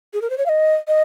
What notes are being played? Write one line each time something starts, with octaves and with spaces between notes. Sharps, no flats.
G#4
A#4
C5
C#5
F5
D#5
D#5